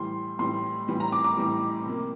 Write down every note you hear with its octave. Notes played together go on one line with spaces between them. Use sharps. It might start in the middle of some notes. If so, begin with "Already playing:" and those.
Already playing: A2 E3 G3 C6
A2 E3 G3 C6
A2 E3 G3
A#5
D6
D6
A2 E3 G3
C3 F3 A#3